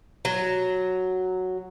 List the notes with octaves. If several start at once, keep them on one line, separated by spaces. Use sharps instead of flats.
F#3